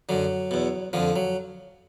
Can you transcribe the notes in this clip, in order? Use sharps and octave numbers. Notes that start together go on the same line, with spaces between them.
F#2 D3 F#3
E2 B2
F2 D3 F3
F#3